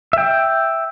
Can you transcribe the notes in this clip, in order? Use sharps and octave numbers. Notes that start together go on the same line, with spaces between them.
E5 G5